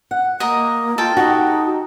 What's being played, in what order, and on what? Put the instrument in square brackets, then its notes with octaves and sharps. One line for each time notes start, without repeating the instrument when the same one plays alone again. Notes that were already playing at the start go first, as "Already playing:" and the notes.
[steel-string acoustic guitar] F#5
[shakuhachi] A#3 [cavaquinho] A#4 D#5
[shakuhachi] F4 [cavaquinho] A4 G5
[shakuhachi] D#4 [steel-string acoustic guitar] F#4 G4